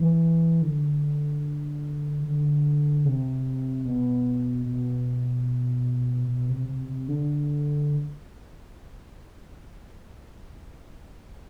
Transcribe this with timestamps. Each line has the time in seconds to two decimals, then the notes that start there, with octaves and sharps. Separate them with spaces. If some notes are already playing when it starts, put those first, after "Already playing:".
Already playing: E3
0.62 D3
2.23 D3
3.05 C3
3.85 B2
4.66 B2
6.28 B2
6.49 C3
6.69 C3
6.88 C3
7.08 D3